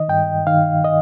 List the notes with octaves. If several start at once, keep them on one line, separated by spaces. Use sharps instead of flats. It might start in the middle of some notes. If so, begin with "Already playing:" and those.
Already playing: D#3 D#5
G2 G5
D#3 F5
D#5